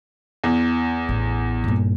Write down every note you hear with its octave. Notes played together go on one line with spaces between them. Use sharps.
E2
A1
G2 A#2